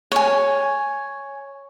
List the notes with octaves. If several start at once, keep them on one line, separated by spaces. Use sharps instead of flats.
C#5 G#5